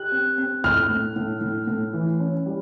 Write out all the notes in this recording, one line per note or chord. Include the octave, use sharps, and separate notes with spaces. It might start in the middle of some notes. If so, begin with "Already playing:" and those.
Already playing: G4 F#6
C4
C4
A2 F6
A2
A2
A2
A2
E3
C#4
G3